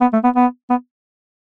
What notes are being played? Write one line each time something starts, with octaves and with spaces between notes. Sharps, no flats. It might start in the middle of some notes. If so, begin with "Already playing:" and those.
B3
A3
B3
B3
B3